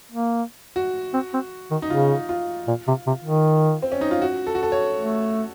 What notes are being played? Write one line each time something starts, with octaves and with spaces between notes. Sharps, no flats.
A#3
F#4
C4
C4
D#3
D#4
C#3 F4
F4
A#2
C3
C3
D#3
C4
C#4
D#4
F4
F#4
A4
F#4
A4
C#5
A3